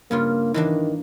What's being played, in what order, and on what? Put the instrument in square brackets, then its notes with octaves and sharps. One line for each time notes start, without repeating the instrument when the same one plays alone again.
[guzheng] G2 C#3 F4 [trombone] A#3
[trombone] D#3 [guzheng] E3 A#3 D4